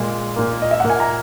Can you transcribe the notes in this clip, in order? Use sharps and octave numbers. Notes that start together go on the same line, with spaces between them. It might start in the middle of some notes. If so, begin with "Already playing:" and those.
Already playing: A#2 G#3
A#2 A#3
D#5
E5
A#2 A#3 F#5
G#5
A#5